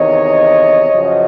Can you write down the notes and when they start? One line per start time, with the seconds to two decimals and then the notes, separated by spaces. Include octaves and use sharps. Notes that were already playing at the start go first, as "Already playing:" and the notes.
Already playing: E2 C3 D#3 C#5 D#5
0.93 F#2 C#3 F3